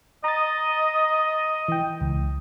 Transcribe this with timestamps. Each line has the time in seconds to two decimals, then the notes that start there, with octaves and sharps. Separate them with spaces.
0.24 D#5 A#5 A6
1.68 E3 G5
2.01 C#2